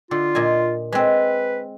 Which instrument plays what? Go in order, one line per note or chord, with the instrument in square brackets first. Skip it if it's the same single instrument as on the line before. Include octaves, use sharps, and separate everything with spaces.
[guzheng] D3 [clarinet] F4
[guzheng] A#2 D#5 G#5
[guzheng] G#3 C4 [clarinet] B4